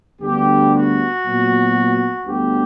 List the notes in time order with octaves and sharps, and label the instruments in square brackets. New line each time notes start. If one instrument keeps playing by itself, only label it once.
[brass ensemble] D2 D3 G3 B3 G4
F#4
A#2 F#3 B3
D2 D3 G3 B3 G4